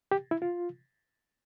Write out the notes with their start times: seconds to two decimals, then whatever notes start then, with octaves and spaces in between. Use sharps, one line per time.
0.12 G4
0.31 E4
0.42 F4